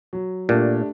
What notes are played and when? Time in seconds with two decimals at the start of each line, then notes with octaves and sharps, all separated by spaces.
0.13 F#3
0.49 A#2 A3 D4 G4